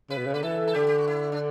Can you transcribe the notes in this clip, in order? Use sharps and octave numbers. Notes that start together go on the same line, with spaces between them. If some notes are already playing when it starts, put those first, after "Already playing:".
C#3 B4
B2
C#3
D3 B4
E3 A4
A4
D3 G4
G4
F#4
E4
D4